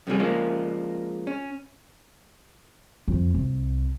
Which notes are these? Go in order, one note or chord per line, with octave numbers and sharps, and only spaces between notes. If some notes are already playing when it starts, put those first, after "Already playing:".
F2 C3 G3 G#4
F3 G#3 A#3 C#4
C#4
F2
C2